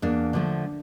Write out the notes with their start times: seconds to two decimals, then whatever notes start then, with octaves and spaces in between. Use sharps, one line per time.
0.02 E2 A#3 D4
0.33 D3 F3 A3